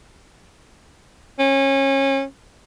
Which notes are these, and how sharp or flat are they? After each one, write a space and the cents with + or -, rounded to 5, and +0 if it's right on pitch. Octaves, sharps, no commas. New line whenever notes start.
C#4 -25